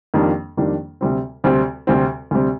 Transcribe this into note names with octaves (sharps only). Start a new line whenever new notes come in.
F2 D#3 G3 A#3 D4
F2 D#3 G3 A#3 D4
D2 C3 G3 C4
D2 C3 G3 C4
D2 C3 G3 C4
D2 C3 G3 C4